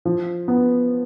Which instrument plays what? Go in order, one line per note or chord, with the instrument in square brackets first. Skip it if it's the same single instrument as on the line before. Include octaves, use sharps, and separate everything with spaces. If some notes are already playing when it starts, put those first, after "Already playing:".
[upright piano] F3
B3